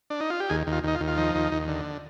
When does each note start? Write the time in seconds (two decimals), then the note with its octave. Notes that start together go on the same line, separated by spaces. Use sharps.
0.10 D4
0.20 D#4
0.30 F4
0.40 G4
0.49 D#2 G#4
0.67 D#2
0.72 F4
0.84 D#2 D#4
0.95 F4
1.00 D#2
1.08 F4
1.17 F3 D#4
1.35 D#2
1.52 D#2
1.68 D3